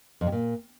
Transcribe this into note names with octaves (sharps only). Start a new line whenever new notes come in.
F2
C3
A#2